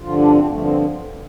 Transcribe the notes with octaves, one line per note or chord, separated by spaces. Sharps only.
G2 D3 F3 F4
D4
C4
G2 D3 F3 A3
C4